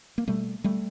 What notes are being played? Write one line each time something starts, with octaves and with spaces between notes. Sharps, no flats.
A#3
B2 G3 A3
G3 A3